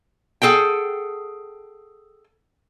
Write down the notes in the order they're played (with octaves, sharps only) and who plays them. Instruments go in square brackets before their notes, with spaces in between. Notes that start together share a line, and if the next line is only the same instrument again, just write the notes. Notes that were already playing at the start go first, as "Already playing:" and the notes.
[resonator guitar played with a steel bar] G#4 A4 F#5 G5